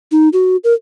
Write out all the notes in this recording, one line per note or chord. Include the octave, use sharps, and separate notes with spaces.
D#4
F#4
A#4